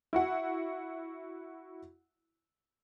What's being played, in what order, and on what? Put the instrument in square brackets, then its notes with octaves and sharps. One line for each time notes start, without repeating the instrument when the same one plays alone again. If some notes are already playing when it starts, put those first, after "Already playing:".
[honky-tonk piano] E4 F#4 F#5